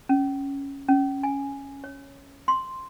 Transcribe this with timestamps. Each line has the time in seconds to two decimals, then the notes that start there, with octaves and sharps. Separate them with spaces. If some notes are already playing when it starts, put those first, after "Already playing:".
0.09 C#4
0.88 C#4
1.23 G#5
1.84 C#5
2.48 C6